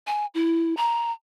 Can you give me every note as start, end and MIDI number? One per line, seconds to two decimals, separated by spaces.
0.07 0.26 80
0.34 0.74 64
0.77 1.11 82